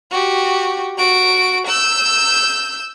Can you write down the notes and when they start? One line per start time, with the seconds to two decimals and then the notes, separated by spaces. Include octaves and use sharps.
0.11 F#4 G4
0.98 F#4 D7
1.68 E6 G6